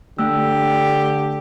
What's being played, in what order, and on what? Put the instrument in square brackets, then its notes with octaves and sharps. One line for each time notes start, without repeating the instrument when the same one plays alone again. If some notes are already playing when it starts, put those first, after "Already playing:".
[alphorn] D3 [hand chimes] A3 E6 [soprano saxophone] G4